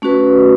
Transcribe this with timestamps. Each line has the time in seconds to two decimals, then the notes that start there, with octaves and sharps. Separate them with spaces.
0.02 A3 C#4 F#4 B4